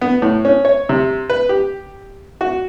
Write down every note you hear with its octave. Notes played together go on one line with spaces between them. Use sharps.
B3
A2
C#4
C#5
C3
B4
G4
F#4